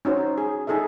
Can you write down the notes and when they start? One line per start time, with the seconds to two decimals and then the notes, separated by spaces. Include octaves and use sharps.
0.05 C#4 D#4 F#4 C5
0.38 G#4
0.67 D#4 G#4 A4 D#5 E5